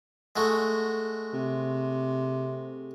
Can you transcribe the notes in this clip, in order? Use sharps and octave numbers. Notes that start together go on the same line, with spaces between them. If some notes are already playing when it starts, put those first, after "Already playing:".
G#3 A3 F#4
C3